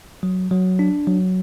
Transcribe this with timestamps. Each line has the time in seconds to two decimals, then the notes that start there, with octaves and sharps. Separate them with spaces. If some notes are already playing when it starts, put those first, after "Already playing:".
0.23 F#3
0.51 F#3
0.79 D4
1.07 F#3